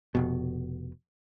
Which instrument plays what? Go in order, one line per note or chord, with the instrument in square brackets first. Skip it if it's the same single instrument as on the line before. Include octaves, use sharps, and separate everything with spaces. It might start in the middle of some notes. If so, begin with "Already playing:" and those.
[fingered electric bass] F1 B2